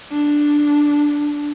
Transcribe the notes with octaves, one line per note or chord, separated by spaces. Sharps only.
D4